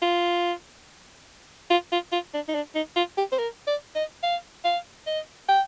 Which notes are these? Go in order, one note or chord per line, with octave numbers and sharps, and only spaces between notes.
F4
F4
F4
F4
D4
D#4
D4
D#4
F4
G4
C5
A#4
D5
D#5
F5
F5
D#5
G5